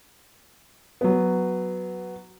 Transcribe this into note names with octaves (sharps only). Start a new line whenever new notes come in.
F#3 B3